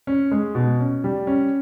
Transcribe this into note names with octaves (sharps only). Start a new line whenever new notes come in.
C#4
G#3
B2
C#4
G3
C#4